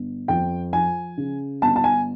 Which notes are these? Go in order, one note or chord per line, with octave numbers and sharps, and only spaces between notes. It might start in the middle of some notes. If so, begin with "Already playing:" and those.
Already playing: G1
F2 G5
F3 G#5
C#3
G1 A5
A5
G#5